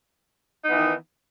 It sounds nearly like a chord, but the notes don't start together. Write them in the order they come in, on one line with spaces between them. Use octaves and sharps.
D#4 B3 E3 D#3